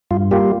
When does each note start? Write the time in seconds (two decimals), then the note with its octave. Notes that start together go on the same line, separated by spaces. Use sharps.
0.11 G2 F4
0.31 G3 A#3 F4 G4